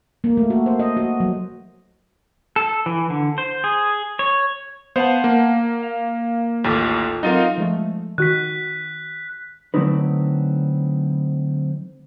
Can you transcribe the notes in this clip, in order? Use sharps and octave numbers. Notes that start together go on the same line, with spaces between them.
A#3
A3
F#4
C5
D#5
F#4
F#3
A4
E3
D3
C5
G#4
C#5
B3 C5 F5 F#5 A5
A#3
F5
A1 D#2 F4 A4 D6
F#3 C4 D#4 F4 A#4 F5
F3 G#3 A3
D#3 F#4 F#6 B6
D3 F#3 A3 C4 D#4 B4